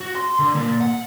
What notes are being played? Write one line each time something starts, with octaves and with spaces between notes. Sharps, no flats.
F#4
C6
D3
A#2
F#5